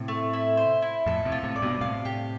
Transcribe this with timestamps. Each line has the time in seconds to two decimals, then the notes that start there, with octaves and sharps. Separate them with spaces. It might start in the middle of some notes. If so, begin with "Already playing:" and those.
Already playing: A2 C3
0.08 A3
0.33 E4
0.57 C5
0.82 E4
1.06 F2 A2 A4
1.25 A2 C3
1.32 F4
1.43 A2 C3
1.56 A2 D5
1.62 G2 B2
1.81 A2 C3 F5
2.05 G4